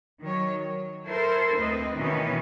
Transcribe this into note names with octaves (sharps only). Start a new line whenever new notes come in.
D#3 F#3 C#5
F#3
E4 A4 A#4 C5
D2 C4 B4 D#5
B2 D#3 E3 B3 C#4